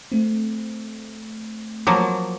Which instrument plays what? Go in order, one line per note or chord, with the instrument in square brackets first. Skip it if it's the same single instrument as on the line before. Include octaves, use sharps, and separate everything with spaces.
[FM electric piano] A3 C4
[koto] F3 F#3 A#3